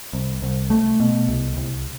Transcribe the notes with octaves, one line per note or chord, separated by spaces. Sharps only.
C2
C2
A3
B2
C2
C2